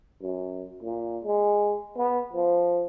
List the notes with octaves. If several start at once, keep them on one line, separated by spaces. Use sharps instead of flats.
F#2
A#2
G#3
B3
F3